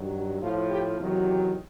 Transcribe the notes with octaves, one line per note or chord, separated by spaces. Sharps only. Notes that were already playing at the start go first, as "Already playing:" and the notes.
Already playing: G2 D#3 F#3
F#4
A2 F3 F4
G4
E2 C3 D#3 F#3
G4